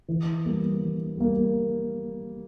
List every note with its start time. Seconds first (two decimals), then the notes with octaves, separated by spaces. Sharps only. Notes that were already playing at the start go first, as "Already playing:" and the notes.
0.08 E3
0.45 G3 A#3
0.81 E3
1.17 G3 A#3